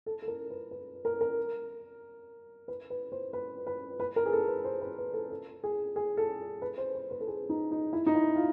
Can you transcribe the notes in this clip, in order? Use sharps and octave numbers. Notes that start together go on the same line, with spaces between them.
A4
A4
A#4
B4
B4
A#4
A#4
B4
B4
C5
B4
B4
B4
A#4
G#4
A4
B4
C5
B4
B4
A4
A4
G#4
G#4
A4
B4
C5
C5
B4
A4
G#4
D#4
D#4
E4
D#4
E4
F4